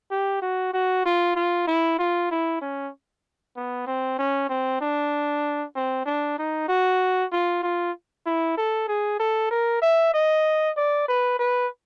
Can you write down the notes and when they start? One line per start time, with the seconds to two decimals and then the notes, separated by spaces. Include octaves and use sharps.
0.11 G4
0.42 F#4
0.74 F#4
1.06 F4
1.36 F4
1.67 E4
1.99 F4
2.31 E4
2.62 C#4
3.56 B3
3.87 C4
4.19 C#4
4.49 C4
4.81 D4
5.76 C4
6.06 D4
6.38 D#4
6.68 F#4
7.32 F4
7.63 F4
8.26 E4
8.58 A4
8.88 G#4
9.20 A4
9.51 A#4
9.82 E5
10.14 D#5
10.77 D5
11.08 B4
11.39 B4